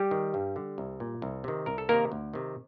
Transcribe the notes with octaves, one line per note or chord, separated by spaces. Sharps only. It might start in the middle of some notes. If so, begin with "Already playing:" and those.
Already playing: G3 G4
D#3
G2
D3
C2
A#2
C2
C3 D#3
C2 A#4
A4
C3 D#3 A#3 A#4
D2
C3 D#3